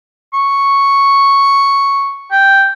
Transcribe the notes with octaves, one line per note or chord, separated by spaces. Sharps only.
C#6
G5